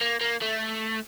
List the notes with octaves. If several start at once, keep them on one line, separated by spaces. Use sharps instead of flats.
A#3
A#3
A3